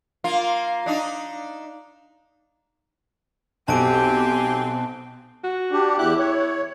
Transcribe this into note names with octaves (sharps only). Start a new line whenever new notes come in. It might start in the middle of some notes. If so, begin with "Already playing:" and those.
A#3 F4
D4 D#4
B1 C4 G4 G#5 A5 D7
F#4
D4 G4
E2 E4 G4 F#6
C#5